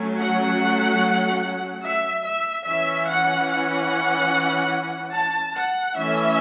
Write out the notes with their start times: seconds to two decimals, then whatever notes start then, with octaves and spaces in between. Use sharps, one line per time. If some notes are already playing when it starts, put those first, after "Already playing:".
Already playing: F#3 A3 C#4
0.18 F#5
1.84 E5
2.25 E5
2.66 E3 C#4 E5
3.08 F#5
3.49 F#5
5.13 A5
5.56 F#5
5.97 E3 A3 C#4 E5